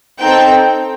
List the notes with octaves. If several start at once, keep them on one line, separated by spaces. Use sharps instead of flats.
C4 D#4 A4 G5